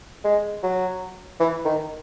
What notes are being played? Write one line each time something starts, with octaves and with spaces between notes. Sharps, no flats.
G#3
F#3
E3
D#3